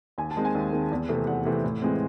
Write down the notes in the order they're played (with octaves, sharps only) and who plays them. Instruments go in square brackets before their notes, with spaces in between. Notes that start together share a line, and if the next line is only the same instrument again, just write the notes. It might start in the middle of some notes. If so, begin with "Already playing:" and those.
[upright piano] D#2 G#5
A5
D#3 G#3 C4
G#5
D#2
D#3 G#3 C4
E2
C3 E3 A3 C4
E2 F#5
C3 E3 A3 C4
A2
E3 G#3 C4